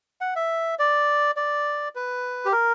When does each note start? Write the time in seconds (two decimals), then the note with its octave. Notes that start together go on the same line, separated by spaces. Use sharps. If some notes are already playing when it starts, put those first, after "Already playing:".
0.21 F#5
0.36 E5
0.79 D5
1.36 D5
1.95 B4
2.45 G4
2.52 A#4